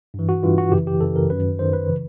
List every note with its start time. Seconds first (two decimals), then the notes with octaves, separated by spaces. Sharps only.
0.14 G2 E3
0.29 F#4
0.43 G2 E3 F4
0.58 F#4
0.72 F#2 C#3 E3 G4
0.87 G4
1.01 F#2 C#3 E3 A4
1.16 A#4
1.30 F#2 D#3 B4
1.59 F#2 D#3 C5
1.73 B4
1.89 C#3 E3